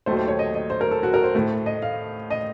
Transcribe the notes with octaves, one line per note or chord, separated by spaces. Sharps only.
D#2 D#3 F#3 A3 C5
C5
C#5
D#5
D#5
C5
A#4
A4
F#4
A#4
C5
A2 A3
D#5
F5
D#5